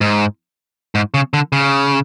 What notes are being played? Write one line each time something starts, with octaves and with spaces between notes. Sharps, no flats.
G#2
G#2
C#3
D3
C#3